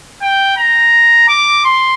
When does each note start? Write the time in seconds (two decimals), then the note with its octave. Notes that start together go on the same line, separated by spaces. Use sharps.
0.22 G5
0.57 A#5
1.28 D6
1.65 C6